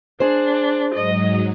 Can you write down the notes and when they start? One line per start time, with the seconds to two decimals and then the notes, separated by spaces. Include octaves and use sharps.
0.20 D4 G#4 C5
0.94 G#2 F#3 D#5